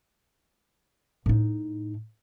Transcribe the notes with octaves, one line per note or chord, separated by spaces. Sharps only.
A2 D#4